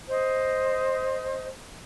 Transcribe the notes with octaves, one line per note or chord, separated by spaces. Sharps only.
C5 D#5